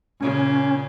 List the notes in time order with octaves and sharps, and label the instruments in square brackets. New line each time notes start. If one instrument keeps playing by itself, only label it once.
[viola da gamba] A#2 C#3 [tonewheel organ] C#4